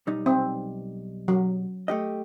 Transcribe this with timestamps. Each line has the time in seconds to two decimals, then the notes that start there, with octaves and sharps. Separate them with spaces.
0.07 B1 G3 D#4
0.26 C4
1.28 F#3
1.88 A3 G4 D#5